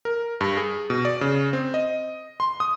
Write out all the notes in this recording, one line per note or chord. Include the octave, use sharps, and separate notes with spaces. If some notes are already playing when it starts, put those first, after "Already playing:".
A#4
G2
G#4
B2
D5
C#3
C4
D#5
C6
D#6